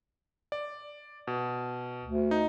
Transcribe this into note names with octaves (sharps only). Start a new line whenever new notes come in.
D5
B2
D2
D#4